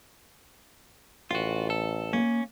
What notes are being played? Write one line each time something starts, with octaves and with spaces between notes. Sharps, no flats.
A1 F4 F#4 G5
A4
A#3 C#4